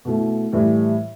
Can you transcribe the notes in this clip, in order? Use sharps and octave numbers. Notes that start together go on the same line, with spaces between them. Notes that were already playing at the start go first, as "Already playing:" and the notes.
B2 A3 E4
A2 E3 G3